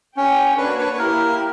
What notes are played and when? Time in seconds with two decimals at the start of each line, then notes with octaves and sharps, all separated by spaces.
0.17 C#4 G4 C#5 G5
0.57 A#3 D4 F#4 B4 C#5
0.78 B4
0.93 B4
0.98 A#3 E4 G4 A#4